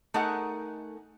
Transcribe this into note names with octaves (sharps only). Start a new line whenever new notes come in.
A3 D#4 G#4 A#4 F#5